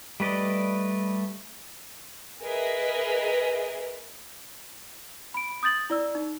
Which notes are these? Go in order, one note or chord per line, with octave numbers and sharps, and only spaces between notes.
G3 A3 B4 D5 D#5
G#4 A#4 B4 D#5 E5
B5 D7
D#6 G6 A6 F#7
E4 D5 E6
D#4